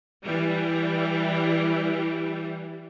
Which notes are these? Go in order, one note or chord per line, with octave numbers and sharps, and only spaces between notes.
E3 G3